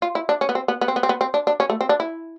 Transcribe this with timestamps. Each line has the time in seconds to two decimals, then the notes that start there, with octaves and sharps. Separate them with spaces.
0.02 F4
0.15 E4
0.29 D4
0.41 C#4
0.49 B3
0.55 C4
0.68 B3
0.81 B3
0.88 C4
0.96 B3
1.03 C4
1.09 B3
1.21 C4
1.34 D4
1.47 D4
1.60 C#4
1.70 A3
1.81 C4
1.89 D4
2.00 E4